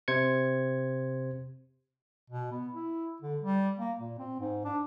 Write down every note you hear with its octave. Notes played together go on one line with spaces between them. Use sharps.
C3 C5 G#6 C#7
B2
B3
E4
D3
G3
A#3
A#2
C4
G#2
D4